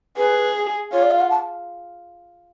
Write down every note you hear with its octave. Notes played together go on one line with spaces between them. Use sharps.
G#4 B4
F4 C#5
D5
F5
F#5
A5